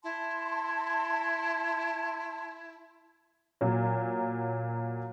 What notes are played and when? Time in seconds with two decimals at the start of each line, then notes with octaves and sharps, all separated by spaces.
0.04 E4 A5 C6
3.61 A#2 F#3